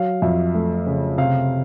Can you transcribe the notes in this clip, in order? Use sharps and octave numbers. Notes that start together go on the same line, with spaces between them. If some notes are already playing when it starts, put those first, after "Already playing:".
Already playing: F#3 F5
F2 E5
A3
C#3
C3 F5